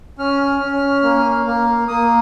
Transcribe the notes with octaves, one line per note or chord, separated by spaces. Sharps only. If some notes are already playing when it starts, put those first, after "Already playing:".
C#4 F6
C#4
A#3
A#3
A#3 D#6